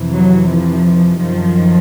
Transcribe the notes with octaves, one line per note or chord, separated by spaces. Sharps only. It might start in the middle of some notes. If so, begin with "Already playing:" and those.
Already playing: F2 C3 E3
F#3
F3
F#2 D#3 F3